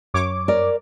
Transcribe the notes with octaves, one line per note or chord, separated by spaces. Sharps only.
F#2 C#5 D6
A#4 D5